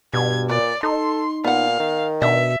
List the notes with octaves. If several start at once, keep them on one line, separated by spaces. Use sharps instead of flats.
G2 B2 G#6
A#2 B4 C#5 D5
D#4 A4 C6
A#2 B3 F5 F#5
D#3
B2 D4 D#5 E5